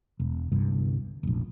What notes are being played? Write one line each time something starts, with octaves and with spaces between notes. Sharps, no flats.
E1
G1 C2 G2
F1 A#1